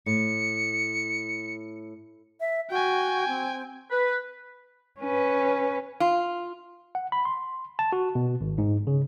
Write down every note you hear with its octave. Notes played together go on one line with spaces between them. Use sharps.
A2 C#7
E5
F#4 G5 G#5
C4
B4
C#4 B4
F4
F#5
B5
C6
A5
F#4
B2
G#1
G#2
C#3